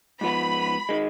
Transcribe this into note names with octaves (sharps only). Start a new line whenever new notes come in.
G#2 F3 B3 B5
D#3 G#3